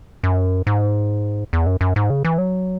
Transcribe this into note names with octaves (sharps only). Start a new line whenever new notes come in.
F#2
G#2
E2
F#2
F#2
G#2
C#3
E3
F#3